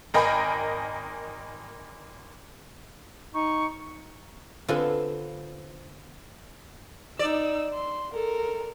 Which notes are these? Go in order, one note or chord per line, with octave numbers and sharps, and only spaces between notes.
G#1 A#4 D#5 G5 G#5 B5
D#4 C#6
D3 B3 C4 F4 A4 G#5
D#4 D5 E6
C6
A4 A#4